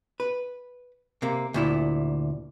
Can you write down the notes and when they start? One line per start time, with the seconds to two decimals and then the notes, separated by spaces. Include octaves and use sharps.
0.20 B4
1.22 C3 A#3
1.54 D2 A#2 E4